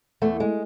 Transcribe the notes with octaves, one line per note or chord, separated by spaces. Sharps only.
E2 A3
G#3